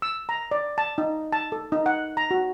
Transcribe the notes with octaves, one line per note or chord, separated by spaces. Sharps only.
E6
A#5
D5
A5
D#4
A5
A4
D#4
F#5
A#5
F#4